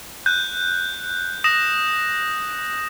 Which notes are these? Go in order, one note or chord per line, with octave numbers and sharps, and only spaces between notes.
F#6 G6
D#6 A#6 E7